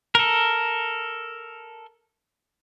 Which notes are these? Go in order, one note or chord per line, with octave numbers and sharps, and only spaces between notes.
A4 A#4